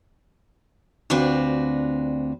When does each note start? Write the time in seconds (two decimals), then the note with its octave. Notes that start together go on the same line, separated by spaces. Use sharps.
1.10 D2 C4 D4 F4 F#4 B4